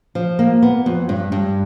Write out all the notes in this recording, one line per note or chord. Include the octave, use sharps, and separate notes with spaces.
F3
A#3
B3
F2
G2
G2